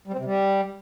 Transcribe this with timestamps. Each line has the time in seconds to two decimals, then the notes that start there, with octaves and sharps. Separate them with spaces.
0.07 G3
0.13 C4
0.19 C3
0.25 G3